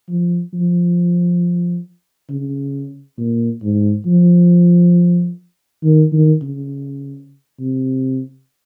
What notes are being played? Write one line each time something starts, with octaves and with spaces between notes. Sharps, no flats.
F3
F3
C#3
A#2
G#2
F3
D#3
D#3
C#3
C3